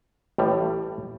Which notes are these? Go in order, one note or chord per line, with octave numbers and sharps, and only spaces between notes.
A1 A2 G3